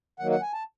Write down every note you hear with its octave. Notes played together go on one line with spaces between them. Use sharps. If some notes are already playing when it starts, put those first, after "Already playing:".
D#3 F#3 A#3 F#5
F#5
G#5
A5